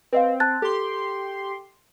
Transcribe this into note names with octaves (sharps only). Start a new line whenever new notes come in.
C4 B4 D#5 F5
A5 F#6 A6
G4 A4 C6